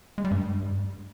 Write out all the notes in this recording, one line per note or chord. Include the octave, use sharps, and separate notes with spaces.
G#3
G3
G2